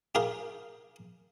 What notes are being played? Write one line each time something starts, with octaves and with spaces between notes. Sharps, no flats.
G4 G#4 A#4 F5 C6